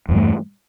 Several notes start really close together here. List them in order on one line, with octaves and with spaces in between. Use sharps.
E2 G2 E3 A3